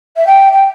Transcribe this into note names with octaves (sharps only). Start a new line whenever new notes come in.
E5
G5
G5